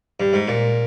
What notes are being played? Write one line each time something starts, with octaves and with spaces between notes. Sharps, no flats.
G2
G#2
A#2